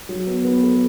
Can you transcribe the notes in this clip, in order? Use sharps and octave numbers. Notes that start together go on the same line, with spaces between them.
F#3
B3
B3
A4